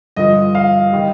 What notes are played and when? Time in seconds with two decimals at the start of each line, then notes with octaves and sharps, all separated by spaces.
0.16 G2 D3 F3 D#5
0.55 F5
0.92 D#3 G3